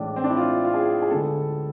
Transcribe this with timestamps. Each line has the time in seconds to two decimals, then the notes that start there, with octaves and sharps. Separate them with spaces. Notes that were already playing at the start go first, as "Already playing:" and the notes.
Already playing: A1 A2 E3 G#3 D4
0.16 C4
0.24 D4
0.30 E4
0.37 F4
0.64 F4
0.74 G#4
1.02 G#4
1.10 D2 D3 G#3 B3 A4